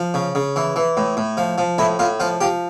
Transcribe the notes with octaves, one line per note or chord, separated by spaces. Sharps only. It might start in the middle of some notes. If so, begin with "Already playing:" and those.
Already playing: F3
C#3
C#3
E3
E3
A2
A2
F3
F3
A2 E4
A2 F4
F3 F4
F3 G4